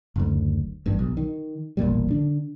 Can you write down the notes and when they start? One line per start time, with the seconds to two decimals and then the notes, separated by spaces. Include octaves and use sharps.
0.16 F#1 D2
0.86 A1 G2
0.99 B1
1.17 D#3
1.77 E1 A1 A#2 G3
2.11 D3 D4